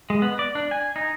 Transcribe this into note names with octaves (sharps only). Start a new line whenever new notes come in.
G#3
B3
D5
D4
G#5
D#4